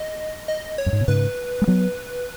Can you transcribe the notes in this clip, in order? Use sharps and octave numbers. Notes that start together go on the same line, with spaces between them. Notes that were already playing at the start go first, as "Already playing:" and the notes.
Already playing: D#5
D#5
C#5
F#2
G#2
B2
G#2 C#3 B4
G#3
F#3 B3